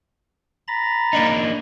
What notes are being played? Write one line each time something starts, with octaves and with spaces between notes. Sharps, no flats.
A#5 B5 A6
A#3 D4 D#4